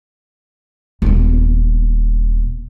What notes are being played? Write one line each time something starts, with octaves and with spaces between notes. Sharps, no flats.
D#1 B3